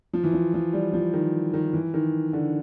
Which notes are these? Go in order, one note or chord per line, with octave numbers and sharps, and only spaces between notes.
F3
E3
F3
F3
G3
F3
D#3
D#3
E3
D#3
D3